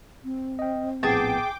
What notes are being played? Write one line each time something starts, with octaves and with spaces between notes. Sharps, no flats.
C4
D#5 G5
A#1 A2 B3 G#4 G5 A5 D6